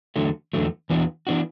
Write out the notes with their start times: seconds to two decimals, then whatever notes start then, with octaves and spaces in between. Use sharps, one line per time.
0.16 E2 D3 F#3 A3
0.53 E2 D3 F#3 A3
0.90 E2 E3 B3 D4 F#4
1.27 E3 B3 D4 F#4